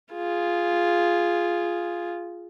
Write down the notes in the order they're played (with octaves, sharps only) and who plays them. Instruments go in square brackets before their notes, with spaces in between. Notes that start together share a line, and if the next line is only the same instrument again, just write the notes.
[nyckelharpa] F4 G#4